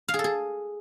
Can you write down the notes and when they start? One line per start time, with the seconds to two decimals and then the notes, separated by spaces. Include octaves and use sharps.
0.08 F5
0.14 G#4
0.19 A4
0.24 G#4